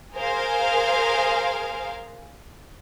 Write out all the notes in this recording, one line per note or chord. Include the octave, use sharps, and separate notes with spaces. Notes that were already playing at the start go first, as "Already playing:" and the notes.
G#4 A#4 C5 F5